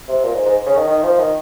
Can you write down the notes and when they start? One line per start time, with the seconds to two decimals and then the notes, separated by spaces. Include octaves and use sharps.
0.08 C3
0.24 A#2
0.34 G#2
0.45 G#2
0.66 C#3
0.77 D#3
0.87 D#3
1.03 F3
1.19 D#3